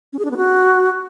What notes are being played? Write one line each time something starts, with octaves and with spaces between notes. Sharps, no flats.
C#4
G#4
D4
B3
F#4